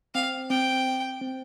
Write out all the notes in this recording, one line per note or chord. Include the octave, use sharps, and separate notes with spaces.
C4 F5
C4 G5
C4